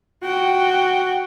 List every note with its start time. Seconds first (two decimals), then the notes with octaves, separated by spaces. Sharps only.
0.24 F#4 G5